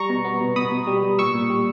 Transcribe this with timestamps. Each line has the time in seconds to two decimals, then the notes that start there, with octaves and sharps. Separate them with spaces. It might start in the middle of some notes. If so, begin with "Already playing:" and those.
Already playing: G3 A#5 C#6
0.09 B2
0.25 B3
0.40 B2
0.56 B2 B5 D#6
0.71 B2
0.87 G3
1.03 G3
1.19 A#2 C#6 E6
1.35 A#2
1.50 G3